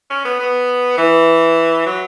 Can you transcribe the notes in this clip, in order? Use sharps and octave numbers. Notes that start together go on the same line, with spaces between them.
C#4
B3
B3
E3
F#3